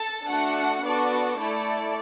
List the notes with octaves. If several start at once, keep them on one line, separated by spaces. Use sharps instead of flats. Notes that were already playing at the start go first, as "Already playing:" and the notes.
Already playing: A4 A5
A3 D4 F#4 A4 F#5
B3 D4 F#4 A4 D5
A3 E4 A4 D5